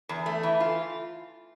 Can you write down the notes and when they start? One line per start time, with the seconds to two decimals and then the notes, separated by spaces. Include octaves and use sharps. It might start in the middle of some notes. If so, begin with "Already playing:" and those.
0.09 E2
0.26 A3
0.43 E3
0.60 F4